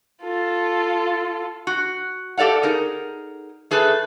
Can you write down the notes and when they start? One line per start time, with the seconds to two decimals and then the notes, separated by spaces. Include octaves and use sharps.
0.23 F4 A4
1.67 F#4
2.37 G4 A4 D5 F5 F#5
2.63 D#4 G#4 A#4
3.71 A3 G#4 A4 B4